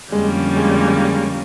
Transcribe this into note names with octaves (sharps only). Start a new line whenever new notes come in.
F2 D3 G3 G#3 A#3 C#4
G#3